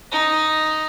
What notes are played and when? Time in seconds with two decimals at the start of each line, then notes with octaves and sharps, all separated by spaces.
0.12 D#4